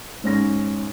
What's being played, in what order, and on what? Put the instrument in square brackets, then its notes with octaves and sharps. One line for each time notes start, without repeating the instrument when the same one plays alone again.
[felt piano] G#2 C#4 A#6